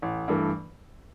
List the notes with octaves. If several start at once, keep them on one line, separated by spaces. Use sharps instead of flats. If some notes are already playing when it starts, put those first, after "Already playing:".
A1
G2 E3 A3